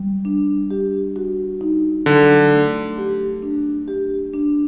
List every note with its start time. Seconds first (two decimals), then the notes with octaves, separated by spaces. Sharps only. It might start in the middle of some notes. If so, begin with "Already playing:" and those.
Already playing: G3
0.25 D4
0.71 G4
1.16 F#4
1.61 D#4
2.06 D3 F#3
2.52 A3
2.98 G4
3.42 D4
3.88 G4
4.33 D4